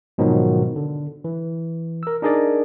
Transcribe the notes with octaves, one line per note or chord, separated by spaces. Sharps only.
G#2 B2 D#3 F3 F#3
D3
E3
A#4 E6
D4 D#4 G#4 A#4 D5